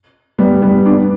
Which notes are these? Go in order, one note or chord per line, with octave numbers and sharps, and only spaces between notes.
G3 B3
G3 B3
B3 D4